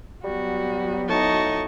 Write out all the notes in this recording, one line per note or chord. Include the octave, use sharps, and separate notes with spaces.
F#3 G3 B3 F#4
A2 D#4 F#4 D#5 A5 C#6